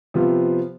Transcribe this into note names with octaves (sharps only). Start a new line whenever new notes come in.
C3 F3 B3 F4